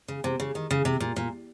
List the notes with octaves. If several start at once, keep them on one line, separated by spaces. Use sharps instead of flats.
C#3
C3
C#3
D#3
C#3
C3
A#2
A#2